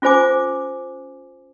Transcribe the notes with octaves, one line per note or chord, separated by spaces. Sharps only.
C#4 F4 A4 C5 G#5 D6